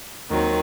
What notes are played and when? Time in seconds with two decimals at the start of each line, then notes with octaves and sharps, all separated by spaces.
0.29 D#2 D#3 F#3 C4